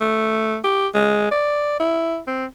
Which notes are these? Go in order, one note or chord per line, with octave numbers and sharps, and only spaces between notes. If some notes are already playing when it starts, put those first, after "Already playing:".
A3
G4
G#3
D5
E4
C4